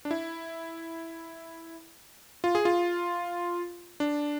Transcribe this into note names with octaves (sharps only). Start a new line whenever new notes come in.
D4
E4
F4
G#4
F4
D4